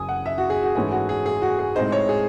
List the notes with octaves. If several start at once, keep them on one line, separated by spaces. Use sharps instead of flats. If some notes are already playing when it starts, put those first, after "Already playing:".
Already playing: F#2 C#3 F#3 G#5 D#6
F#5
E5
F#4
G#4
F#4
G#2 E3 A3 C#4 G#4
F#4
G#4
G#4
F#4
G#4
A2 G#3 C4 D#4 C5
C#5
G#4